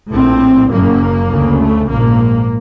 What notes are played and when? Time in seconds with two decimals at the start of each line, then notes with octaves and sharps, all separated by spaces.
0.12 A#1 A2 C4
0.70 F#1 F#2 C#3 A#3
1.30 D2 C#3
1.60 A3
1.89 A#1 G#2 A#3